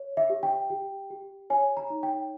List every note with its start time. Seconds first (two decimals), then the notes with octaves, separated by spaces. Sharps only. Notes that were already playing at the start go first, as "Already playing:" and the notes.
Already playing: C#5
0.17 E5
0.30 G4
0.43 G5
0.70 G4
1.10 G4
1.50 C#5 G#5
1.77 A#5
1.90 D#4
2.03 G5